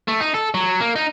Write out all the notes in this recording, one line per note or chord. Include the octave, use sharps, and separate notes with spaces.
A3
D#4
A4
F#3
A#3
D#4